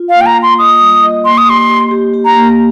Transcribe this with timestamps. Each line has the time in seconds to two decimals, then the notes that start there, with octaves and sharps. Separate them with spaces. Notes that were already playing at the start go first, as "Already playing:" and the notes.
Already playing: F4
0.09 F5
0.15 A#3
0.21 G5
0.26 A#5
0.37 F4
0.43 C6
0.59 D#5 D#6
0.80 G3
1.03 D#5
1.25 A#3 C6
1.38 D#6
1.48 G4 C6
1.69 G4
1.91 G4
2.14 G4
2.25 A#5
2.36 A#3